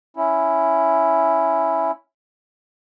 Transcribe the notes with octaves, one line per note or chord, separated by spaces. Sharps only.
C#4 E4